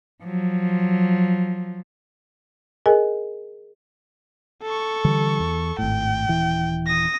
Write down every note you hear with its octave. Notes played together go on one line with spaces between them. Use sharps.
F3 F#3
G#4 A#4 D#5 G#5
A4 C#6
D3 E3 G3
E2
G#1 A2 G5
D#1 E3
D#6 A#6